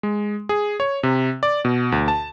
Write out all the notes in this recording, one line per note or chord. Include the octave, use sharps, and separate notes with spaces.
G#3
G#4
C#5
C3
D5
B2
D2
A5